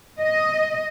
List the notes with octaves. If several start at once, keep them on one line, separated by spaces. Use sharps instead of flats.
D#5